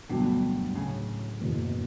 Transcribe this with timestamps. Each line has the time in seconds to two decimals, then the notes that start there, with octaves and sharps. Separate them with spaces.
0.09 D2 G2 B2 D3 F#3
0.75 A2 C#3
1.41 F#1 E2 B2 F#3